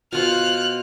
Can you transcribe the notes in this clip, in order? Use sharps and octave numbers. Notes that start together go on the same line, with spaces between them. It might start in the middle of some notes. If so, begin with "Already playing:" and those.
B2 F4 C5 F6 F#6